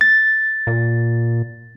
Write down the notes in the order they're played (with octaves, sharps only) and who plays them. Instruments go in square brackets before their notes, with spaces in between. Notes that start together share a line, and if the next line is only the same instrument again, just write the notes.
[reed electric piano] A6
[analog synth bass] A#2